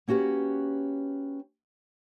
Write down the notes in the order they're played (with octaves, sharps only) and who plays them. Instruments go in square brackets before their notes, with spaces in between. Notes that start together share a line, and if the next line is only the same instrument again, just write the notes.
[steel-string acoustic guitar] A#3 C#4 F#4 G4 B4